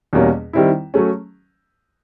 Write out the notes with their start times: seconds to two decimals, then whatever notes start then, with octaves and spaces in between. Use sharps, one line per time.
0.13 E2 B2 G3 A#3 C#4
0.53 D#3 G3 C4 E4
0.94 F#3 A3 C#4